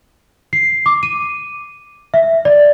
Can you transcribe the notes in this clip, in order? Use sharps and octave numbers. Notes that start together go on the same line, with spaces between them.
C7
D6
D#7
E5
D5